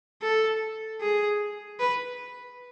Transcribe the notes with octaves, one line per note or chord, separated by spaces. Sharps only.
A4
G#4
B4